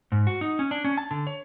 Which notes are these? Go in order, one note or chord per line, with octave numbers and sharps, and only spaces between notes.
G#2
F#4
D#4
C#4
D4
C#4
A5
D3
C#5